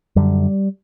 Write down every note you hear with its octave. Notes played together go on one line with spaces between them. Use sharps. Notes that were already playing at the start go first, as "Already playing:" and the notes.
F#2 D3 G3